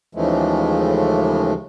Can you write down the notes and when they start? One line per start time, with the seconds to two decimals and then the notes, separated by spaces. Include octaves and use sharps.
0.15 D#2 C#3 E3 F3 G#3 A3